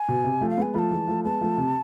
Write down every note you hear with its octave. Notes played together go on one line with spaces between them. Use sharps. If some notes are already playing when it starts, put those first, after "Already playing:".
Already playing: G#5
B2
C3
F3 A3
F5
G#3 B3 G#5
F3 A3 A5 B5
E3 G#3
F3 A3
G#3 B3 A5
F3 A3
C3